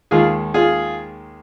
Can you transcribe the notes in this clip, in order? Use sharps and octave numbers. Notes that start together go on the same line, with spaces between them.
D#2 D#3 G#3 F4 G#4
F4 G#4